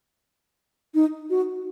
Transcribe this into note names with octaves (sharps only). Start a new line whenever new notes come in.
D#4
F#4